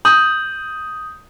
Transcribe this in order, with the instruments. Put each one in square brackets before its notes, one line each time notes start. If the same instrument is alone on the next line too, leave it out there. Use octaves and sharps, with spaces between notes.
[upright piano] D#6 [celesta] G6 F#7